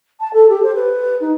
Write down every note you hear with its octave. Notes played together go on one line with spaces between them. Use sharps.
A5
A4
G4
C5
B4
D#4